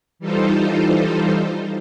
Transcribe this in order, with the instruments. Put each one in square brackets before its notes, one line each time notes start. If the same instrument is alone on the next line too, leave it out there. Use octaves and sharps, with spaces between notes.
[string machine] E3 G3 D#4 F4 A4 C5